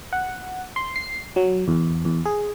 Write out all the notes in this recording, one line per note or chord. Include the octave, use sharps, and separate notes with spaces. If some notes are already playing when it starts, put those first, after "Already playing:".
F#5
C6
C7
F#3
E2
E2
G#4